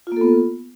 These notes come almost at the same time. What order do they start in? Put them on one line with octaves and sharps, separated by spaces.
F4 A#3 A4 B3